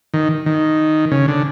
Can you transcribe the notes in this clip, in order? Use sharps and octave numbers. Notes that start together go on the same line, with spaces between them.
D#3
D#3
C#3
D3